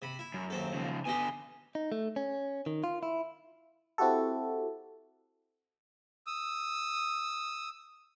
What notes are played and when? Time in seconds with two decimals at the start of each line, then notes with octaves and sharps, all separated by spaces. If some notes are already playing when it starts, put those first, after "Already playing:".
0.02 C3 B5
0.19 E4
0.34 F#2
0.50 D#2 C4 A4
0.74 C#3 F3
1.05 B2 D3 D#4 G4 G#5
1.75 D#4
1.92 A3
2.16 C#4
2.66 D#3
2.84 F4
3.03 E4
3.98 C4 E4 F#4 G4 A4
6.27 D#6 E6